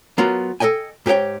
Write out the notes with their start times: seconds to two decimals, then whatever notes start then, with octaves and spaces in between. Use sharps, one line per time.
0.18 F#3 B3 F4 A#4
0.60 A4 A#4 D#5 G5 G#5
1.06 G#2 G4 G#4 C#5 G5